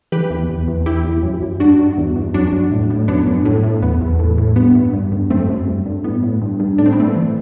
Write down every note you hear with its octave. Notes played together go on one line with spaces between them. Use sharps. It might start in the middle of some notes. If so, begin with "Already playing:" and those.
E3 G4 B4
E2
E2
E2
E2 E4 G4
E2
F#2
F#2
G2 D4 F#4
G2
E2
E2
F#2 D4 F#4
F#2
A2
A2
F#2 B3 D4
F#2
A2
A2
E2 B3
E2
A2
A2
G2 B3
G2
G2
G2
F#2 A3 C4
F#2
G2
G2
A2 B3
A2
G2
G2
A2 D4
C4
B3
A2 A3 C4
E3